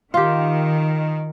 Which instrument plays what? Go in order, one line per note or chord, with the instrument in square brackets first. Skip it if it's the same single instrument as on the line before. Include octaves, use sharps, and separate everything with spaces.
[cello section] D#3 [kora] F4 G4